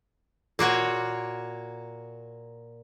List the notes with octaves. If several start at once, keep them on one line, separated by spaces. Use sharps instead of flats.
A#2 A#3 F#4 C#5